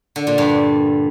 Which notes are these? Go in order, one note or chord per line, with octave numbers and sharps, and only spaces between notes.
D3
A#2
G2